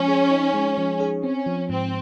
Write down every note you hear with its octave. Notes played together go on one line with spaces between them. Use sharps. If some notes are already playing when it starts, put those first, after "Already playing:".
Already playing: F3 G#3 C#4
G#4
D#4
G#3
F3
G#4
C4 C#4
F3
G#2 C4